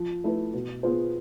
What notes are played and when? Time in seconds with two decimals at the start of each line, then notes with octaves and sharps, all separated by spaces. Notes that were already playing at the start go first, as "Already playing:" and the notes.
Already playing: F3
0.24 A3 E4 B4
0.54 B2
0.83 B3 F4 G#4 C5